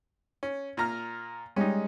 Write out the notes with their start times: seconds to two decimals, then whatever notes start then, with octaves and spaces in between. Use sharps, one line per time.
0.43 C#4
0.77 A#2 A#5 F6
1.56 G3 G#3 C#4 D#4